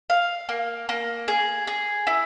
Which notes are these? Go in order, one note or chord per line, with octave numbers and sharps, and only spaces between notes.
F5
A#3
A#3
G#4
G#4
E4